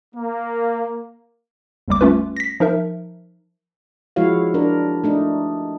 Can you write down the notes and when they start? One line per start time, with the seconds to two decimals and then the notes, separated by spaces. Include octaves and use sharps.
0.15 A#3
1.88 G1 D#2 G3 D6
2.01 A3 C#4 F4 B4
2.37 A#6 B6
2.60 F3 D#4 A#4 E5
4.16 F3 G#3 E4 F#4 C#5 F5
4.54 D4 A#4
5.04 A3 D4 D#4